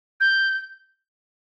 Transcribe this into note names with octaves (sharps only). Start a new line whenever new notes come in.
G6